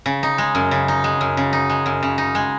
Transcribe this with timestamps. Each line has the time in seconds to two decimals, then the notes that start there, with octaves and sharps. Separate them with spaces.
0.06 C#3
0.23 D#4
0.38 G#3
0.55 F#2
0.71 C#3
0.88 D#4
1.04 G#3
1.21 F#2
1.37 C#3
1.53 D#4
1.69 G#3
1.86 F#2
2.03 C#3
2.18 D#4
2.35 G#3